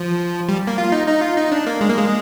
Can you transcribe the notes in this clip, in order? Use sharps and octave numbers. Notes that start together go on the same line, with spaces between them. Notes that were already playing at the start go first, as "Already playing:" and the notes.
Already playing: F3
G3
A#3
F4
D#4
D#4
F4
D#4
D4
A#3
G#3
A#3
G#3